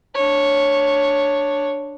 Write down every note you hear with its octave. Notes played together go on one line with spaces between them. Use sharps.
D4 C#5